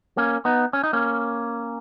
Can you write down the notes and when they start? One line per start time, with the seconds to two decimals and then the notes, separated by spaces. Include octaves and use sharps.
0.17 A#3 C#4
0.45 B3 D#4
0.73 C#4
0.84 D#4
0.93 A#3 C#4